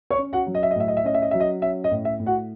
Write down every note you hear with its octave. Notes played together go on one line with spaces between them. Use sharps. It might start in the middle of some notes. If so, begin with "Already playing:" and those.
C#5 C#6
C#4
F#4 F#5
F#3
D#5
E5
D#5
A2 E5
D#5
E5
C#4 D#5
E5
D#5
F#3 E5
D#5
C#4 E5
D#5
A2
E5
A2
F#4 F#5